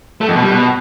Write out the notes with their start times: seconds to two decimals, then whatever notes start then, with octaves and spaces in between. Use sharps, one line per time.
0.21 A3
0.28 F2
0.35 B2
0.43 G3
0.50 B2